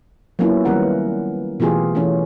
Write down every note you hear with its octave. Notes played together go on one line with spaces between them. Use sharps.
F#3 A#3 B3 C#4 E4 F4
D#3 G3 B3 C#4 A#4 F#5
B2 E3 A3 F4 G4 G#4
E3 A3 C#4